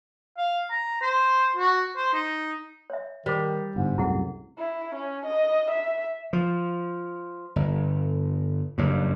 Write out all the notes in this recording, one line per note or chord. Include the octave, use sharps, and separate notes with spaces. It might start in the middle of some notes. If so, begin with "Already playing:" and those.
F5
A#5
C5
F#4
C5
D#4
C#5 E5
D#3 G3 C5 D6
G1 G#2
C2 F#2 A2 E4 G#4 F#5
E4
C#4
D#5
E5
F3
G1
F#1 G2